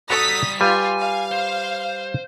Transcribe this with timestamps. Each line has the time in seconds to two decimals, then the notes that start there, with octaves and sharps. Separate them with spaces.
0.10 G3 F#4 A4 A#5 D#6 B6
0.61 G3 F4 B4 G#5
1.00 F5
1.31 C5